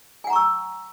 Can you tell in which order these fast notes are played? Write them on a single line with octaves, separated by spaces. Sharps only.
G#5 F#5 A#5 C#6 E6